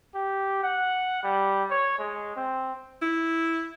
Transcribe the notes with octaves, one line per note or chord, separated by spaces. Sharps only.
G4
F#5
G3
C#5
G#3
C4
E4